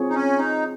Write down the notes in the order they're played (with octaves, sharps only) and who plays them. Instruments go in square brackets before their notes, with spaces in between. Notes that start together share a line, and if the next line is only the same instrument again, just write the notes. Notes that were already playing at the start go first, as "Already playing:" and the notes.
Already playing: [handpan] C4 F4 G#4 C#5
[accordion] D#4
C#4
D#4